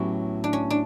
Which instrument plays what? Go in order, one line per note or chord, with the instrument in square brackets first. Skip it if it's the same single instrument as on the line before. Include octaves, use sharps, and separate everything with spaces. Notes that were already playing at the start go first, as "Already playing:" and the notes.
Already playing: [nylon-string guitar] A2 F#3 B3 E4 G4 [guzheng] C#4
[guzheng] D4
C#4
D4